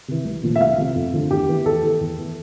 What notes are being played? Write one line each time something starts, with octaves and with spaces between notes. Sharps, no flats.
C3 E3
C2
A#2 F3
E5
C2 F5
C3 F3
F2
D3 F3
E2 G4
E3
E2 A4
E3
E2
E3